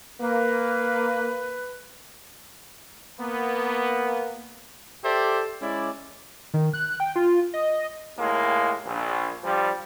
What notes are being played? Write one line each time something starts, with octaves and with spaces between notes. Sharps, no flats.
A#3 B4
A#3 B3
G4 A4 C5 D5 E5
G#3 C#4 E4 D5
D#3
F#6
G5
F4
D#5
D#2 A2 G#3 A#3
A#1
G2 F3 G3